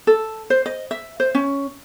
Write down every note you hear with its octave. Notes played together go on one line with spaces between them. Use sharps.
A4
C5
D#5
E5
C5
C#4